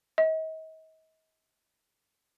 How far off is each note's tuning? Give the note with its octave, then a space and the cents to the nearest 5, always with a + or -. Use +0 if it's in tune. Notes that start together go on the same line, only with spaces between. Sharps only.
D#5 +40